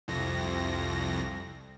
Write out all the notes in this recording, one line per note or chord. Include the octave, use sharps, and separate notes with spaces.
C2 F2 A#6